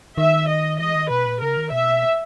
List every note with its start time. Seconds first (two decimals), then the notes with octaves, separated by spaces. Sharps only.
0.18 D#3 E5
0.48 D#5
0.79 E3 D#5
0.95 D#3
1.10 B2 B4
1.26 A#2
1.41 C#3 A#4
1.57 D#3
1.72 B2 E5